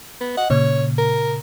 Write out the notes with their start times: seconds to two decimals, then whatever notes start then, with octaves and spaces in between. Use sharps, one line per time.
0.21 B3
0.37 D#5 F#5
0.50 A#2 C#3 C#5
0.98 A#4